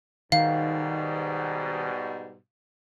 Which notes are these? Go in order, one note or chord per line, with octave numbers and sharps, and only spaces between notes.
G#2 B2 D#3 G3 F5